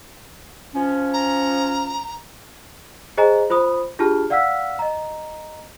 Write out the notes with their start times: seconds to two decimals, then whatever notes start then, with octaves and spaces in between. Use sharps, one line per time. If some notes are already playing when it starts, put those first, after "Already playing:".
0.74 F3 C#4
1.14 A#5
3.18 G#4 C5 D#5 G#5 A#5
3.50 F4 C5 B5 D#6
3.99 D4 F4 G4 G#4 A5 F6
4.30 D5 F5 F#5 E6 F6 B6
4.79 D#5 A#5